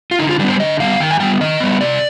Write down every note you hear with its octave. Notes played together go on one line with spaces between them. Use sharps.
F4
D3 D#4
F4
G3 B3 D4
C5
D3 D#5
G3 B3 F5
D#3 G5
G#5
G3 B3 G5
D#3 D#5
G3 B3
C3 D5